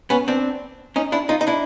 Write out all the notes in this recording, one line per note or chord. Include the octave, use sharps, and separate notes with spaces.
B3 C#4
C4 D4
C#4 D#4
D4 E4
D#4 F4
D#4
D4 E4